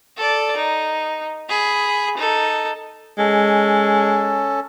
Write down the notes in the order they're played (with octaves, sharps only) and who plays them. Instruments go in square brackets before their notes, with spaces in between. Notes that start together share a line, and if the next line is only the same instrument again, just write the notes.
[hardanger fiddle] A4 D5
D#4
G#4 B5
D#4 A4
[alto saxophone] G#3 [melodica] C#4 A4